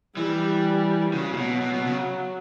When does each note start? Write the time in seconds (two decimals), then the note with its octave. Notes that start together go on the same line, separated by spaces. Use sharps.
0.17 E3 G3
1.13 C#3 F#3
1.33 A2
1.38 B2
1.61 B2
1.74 B2
1.86 C#3